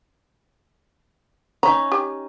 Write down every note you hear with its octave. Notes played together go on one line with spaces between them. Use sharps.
C#4 D#4 E5 A#5
G4